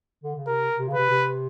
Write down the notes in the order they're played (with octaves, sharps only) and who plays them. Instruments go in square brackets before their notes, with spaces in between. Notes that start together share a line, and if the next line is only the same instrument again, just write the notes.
[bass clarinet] D3
C#3
[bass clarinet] C3 [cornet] A#4
[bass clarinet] C3
C#3
[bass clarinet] C3 [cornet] B4
[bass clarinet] C3